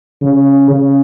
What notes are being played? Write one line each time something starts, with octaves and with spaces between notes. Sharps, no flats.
C#3
C#3